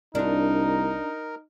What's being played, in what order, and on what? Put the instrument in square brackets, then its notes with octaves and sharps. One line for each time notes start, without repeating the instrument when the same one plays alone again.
[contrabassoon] C2 [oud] D4 F4 [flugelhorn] D#4 [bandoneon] A#4